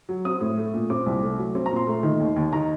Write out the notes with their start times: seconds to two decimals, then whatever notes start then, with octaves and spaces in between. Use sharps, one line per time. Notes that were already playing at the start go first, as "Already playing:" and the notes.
0.09 F#3
0.25 C4 D#6
0.41 A2
0.57 A3
0.74 A#2
0.90 C4 D6
1.06 C2
1.23 A3
1.39 F#3
1.55 C4
1.66 A#5
1.71 A#2
1.76 C6
1.87 A3
2.03 D#3
2.20 D#2
2.36 D#2
2.52 D#3 A#5